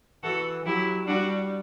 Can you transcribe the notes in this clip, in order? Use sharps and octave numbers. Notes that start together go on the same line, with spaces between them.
E3 F#4 A4
F#3 E4 G4
G3 D4 F#4